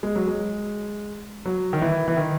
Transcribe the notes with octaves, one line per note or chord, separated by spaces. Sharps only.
G#3
F#3
G#3
F#3
D#3
E3
E3
D#3